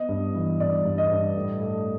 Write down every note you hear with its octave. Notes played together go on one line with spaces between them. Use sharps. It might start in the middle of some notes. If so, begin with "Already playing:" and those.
Already playing: B3 D#5
G2
E3
G2 D5
G2
D#5
G2
A2
A3